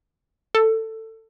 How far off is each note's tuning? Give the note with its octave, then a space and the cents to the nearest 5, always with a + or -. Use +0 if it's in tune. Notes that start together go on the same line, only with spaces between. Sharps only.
A4 +15